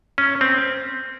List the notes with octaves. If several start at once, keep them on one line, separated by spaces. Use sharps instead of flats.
C#4
C4